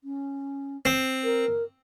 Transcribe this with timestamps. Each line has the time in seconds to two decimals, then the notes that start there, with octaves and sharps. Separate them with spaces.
0.04 C#4
0.85 C4
1.23 A#4